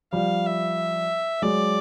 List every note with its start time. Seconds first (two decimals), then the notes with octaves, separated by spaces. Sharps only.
0.13 F3 G3 F5
0.46 E5
1.42 F#3 G#3 D5